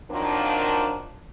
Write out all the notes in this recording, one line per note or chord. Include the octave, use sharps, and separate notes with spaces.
D#3 F3 F#3 A#3 C4 D4